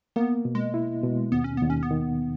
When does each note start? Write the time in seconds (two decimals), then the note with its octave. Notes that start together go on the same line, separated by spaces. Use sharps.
0.16 A#3 B3
0.45 B2
0.55 G#3
0.74 E4
1.03 B2
1.32 D#2 B3
1.44 C#4
1.57 D#2 B3
1.70 C#4
1.83 B3
1.91 D#3